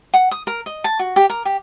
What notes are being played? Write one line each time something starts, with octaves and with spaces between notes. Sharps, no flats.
F#5
D#6
A#4
D#5
A5
F#4
G4
A#4
G4